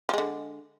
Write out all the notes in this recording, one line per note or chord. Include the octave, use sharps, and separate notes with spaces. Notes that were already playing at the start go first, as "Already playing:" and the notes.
D3 F3 G#3